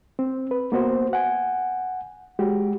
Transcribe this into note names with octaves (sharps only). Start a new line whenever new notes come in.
C4
B4
A#3 B3 F#4 C5
F#5 G#5
G#3 F#4 G4